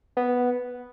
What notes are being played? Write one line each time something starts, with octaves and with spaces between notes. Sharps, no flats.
B3